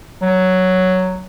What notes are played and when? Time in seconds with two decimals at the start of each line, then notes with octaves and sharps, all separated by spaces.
0.22 F#3